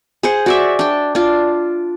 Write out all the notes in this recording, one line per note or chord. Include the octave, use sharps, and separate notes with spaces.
G#4 C5 F#5
F#4 D5 E5
D4 G5
D4 F4